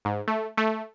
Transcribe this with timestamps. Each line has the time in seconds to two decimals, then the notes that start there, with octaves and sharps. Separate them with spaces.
0.05 G#2
0.28 A3
0.57 A3